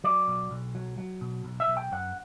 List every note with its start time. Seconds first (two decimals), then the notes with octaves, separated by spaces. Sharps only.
0.04 F#3 D5
0.28 B1
0.51 B1
0.75 F#3
0.98 F#3
1.21 B2
1.44 B1
1.60 E5
1.68 B1
1.77 G5
1.92 F#2 F#5